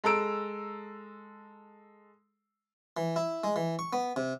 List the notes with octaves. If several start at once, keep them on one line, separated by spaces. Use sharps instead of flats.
G#3 A4 A#5 E6 D7
E3
E4
G#3
E3
C#6
B3
C3